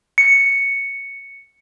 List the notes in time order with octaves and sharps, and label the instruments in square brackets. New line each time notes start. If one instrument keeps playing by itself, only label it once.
[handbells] C#7